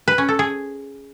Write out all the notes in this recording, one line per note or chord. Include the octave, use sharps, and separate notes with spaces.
B4
C#4
A4
G#4